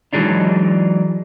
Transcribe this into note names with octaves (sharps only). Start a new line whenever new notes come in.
E3 F#3 G#3 D4 D#4